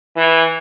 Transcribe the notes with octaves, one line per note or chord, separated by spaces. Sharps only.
E3